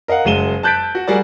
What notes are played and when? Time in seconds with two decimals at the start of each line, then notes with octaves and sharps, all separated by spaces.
0.08 A#4 D#5 F5 F#5
0.25 F#1 F#3 G#3 D#7 E7 G7
0.63 A5 F#6 G6 A6 B6 D7
0.95 F#4
1.08 G3 F#4 G#4 A#4 D5